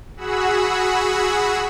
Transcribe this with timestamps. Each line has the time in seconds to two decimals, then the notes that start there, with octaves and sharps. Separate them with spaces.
0.17 F#4 G#4 F#5 B5 E6